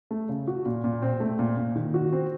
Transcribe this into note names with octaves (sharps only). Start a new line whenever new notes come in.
A3
C#3
F#4
A#2
A#2
C4
A3
A#2
A#2
D#3
F#4
C4